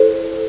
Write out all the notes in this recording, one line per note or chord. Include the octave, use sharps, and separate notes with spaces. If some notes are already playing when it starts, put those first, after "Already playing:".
Already playing: E4 A4 C5